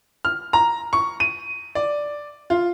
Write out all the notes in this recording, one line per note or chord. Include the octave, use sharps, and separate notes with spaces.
F6
A#5
C#6
D#7
D5
F4